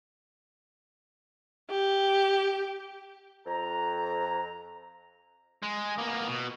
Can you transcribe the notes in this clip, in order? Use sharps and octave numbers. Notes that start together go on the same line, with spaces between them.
G4
F2 A#5
G#3
A#3 B3
B2